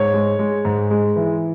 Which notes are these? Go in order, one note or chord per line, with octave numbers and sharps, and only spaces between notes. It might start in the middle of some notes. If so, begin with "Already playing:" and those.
Already playing: G#2 C#5
G#3
G#3
G#2
G#3
E3